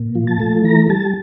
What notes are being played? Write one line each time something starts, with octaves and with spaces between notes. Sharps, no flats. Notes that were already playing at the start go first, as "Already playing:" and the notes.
Already playing: A#2
F3
A5
A3
E3 A#5
G3 A5